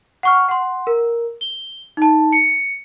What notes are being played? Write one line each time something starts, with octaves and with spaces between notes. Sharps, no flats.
F#5 C#6 F6
F#5 C6
A#4
G7
D#4 A5
C#7